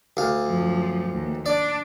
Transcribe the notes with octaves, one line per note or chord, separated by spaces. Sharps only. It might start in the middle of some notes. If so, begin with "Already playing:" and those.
D2 F5
F#2 F3
D#2
D4 D5